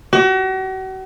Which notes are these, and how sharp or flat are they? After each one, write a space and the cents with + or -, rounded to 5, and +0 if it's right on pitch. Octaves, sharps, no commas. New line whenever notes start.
F#4 +40